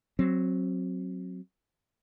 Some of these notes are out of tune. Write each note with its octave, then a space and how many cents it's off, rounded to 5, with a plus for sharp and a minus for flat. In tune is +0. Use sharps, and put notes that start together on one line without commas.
F#3 +0 C4 +15